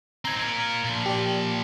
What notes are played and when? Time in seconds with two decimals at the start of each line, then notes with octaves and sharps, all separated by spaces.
0.25 C4 D#4 A#5 G#6 A#6
0.42 F4 A#4
0.84 A#2 F3
1.06 G4 D5